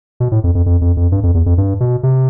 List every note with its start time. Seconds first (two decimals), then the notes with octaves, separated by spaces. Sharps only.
0.20 B2
0.32 A2
0.44 F2
0.55 F2
0.66 F2
0.81 F2
0.97 F2
1.12 G2
1.23 F2
1.34 E2
1.46 F2
1.58 G2
1.80 B2
2.03 C3